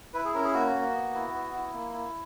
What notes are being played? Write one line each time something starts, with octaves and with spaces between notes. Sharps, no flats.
E4 B4
G#4
C#4 A#4
G#4
A#3 F#4
A#3
B3
E4
B3
E4
A#3
E4